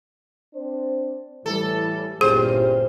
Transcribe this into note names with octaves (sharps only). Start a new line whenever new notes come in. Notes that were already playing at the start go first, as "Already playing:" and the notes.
C4 D4 C5
A2 E3 G3 A4
G1 A#2 C#4 E4 G4 G#4 C5